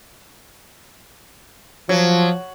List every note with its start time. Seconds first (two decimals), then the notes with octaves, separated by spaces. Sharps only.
1.89 F3 F#3